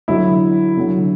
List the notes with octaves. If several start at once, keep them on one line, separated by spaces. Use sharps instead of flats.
D3 F#3 E4
D3 F#3